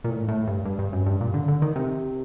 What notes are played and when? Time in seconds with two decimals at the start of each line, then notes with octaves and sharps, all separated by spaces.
0.04 A#2
0.10 A2
0.28 A2
0.47 G2
0.65 G2
0.79 G2
0.93 F#2
1.06 G2
1.21 A#2
1.34 D3
1.48 D3
1.62 D#3
1.76 C3